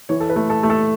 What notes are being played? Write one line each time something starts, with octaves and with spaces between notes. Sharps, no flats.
E3 C#5
A4
B4
A3
A4
A3
A4